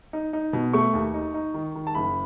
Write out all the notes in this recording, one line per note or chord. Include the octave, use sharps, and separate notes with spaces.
D#4
D#4
B2
A3 C#6
D#2
D#4
D#4
D#3
D#3
A5
F#1 B5